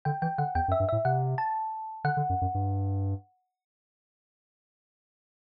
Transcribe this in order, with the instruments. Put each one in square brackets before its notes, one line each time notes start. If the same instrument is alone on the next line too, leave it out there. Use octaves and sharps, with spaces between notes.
[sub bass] D3 [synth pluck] G5
[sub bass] E3 [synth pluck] G5
[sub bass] D3 [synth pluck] F#5
[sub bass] E2 [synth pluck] G5
[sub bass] F#2
[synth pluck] E5
[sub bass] G2
[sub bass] A2 [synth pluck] E5
[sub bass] C3 [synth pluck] F#5
[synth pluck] A5
[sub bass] D3 [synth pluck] F#5
[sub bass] D3
F#2
F#2
G2